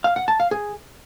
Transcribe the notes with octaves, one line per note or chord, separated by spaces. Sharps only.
F5
F#5
A5
F5
G#4